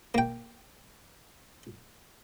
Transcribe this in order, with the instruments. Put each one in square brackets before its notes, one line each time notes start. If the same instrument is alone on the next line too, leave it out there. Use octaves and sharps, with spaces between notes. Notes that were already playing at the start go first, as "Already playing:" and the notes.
[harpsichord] A#3 G5